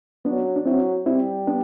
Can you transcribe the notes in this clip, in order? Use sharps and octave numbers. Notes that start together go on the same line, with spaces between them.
F#3 B3 D4
D4
F#3 C4 E4
G3 C4 E4
B3 D4